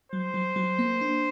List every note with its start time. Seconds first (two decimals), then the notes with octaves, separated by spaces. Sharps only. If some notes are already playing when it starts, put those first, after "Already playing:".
0.12 F#3 C5
0.34 F#3
0.56 F#3
0.79 A#3
1.01 D4